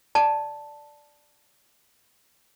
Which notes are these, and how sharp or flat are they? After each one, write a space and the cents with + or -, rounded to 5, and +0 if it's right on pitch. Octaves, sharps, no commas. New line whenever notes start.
D5 +0 A5 +0